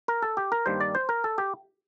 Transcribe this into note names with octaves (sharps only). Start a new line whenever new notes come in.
A#4
A4
G4
A#4
G2 D#3 G3 A#3 D4 C5
D5
C5
A#4
A4
G4